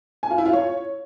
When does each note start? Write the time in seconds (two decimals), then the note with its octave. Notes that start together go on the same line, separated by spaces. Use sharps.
0.23 G#5
0.31 F4
0.38 E4
0.46 F4
0.53 C#5